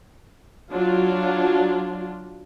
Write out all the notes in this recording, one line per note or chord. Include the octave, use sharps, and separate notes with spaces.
F#3 D4 F4